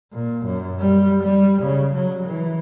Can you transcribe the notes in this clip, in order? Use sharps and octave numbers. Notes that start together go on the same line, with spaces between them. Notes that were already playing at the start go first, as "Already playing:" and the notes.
A#2
F#2
G3
G3
C#3
F#3
E3